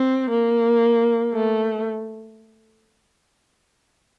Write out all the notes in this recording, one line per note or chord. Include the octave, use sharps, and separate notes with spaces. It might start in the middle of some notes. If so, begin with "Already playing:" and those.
Already playing: C4
A#3
A3